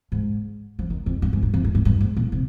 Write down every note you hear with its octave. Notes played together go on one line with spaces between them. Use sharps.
G#2
F3
D#3
F2
G2
G#2
G2
F2
G2
G2
G2
G#2
A#2
C3